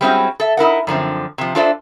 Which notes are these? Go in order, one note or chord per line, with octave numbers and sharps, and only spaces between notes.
G3 G#3 C4 C#4 E4 F#4
A4 E5
D#4 E4 A#4 F#5
F#2 D3 F3 C4
C3 F3
D4 F4 A4 C5 D5 E5